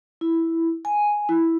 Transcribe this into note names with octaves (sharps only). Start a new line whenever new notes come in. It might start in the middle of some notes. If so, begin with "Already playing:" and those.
E4
G#5
E4